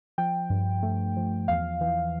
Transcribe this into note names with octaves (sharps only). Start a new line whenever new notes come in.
F3 G5
G2
A3
F3
E2 F5
E3